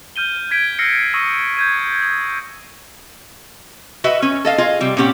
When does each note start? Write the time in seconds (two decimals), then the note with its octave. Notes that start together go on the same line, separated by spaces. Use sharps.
0.16 F6 G6 D#7 G7
0.51 G6 G#6 B6 D7
0.79 E6 F6 A#6 C7 C#7
1.14 C#6 D#6 E6 A#6 D#7
1.57 G6 G#6 D#7
2.02 D#6
4.04 F#4 B4 D#5 E5
4.22 C#4
4.45 A4 D#5 F5
4.58 F4 G#4 D#5
4.81 C3 G3
4.97 A#2 C4 C#4 G4 F#5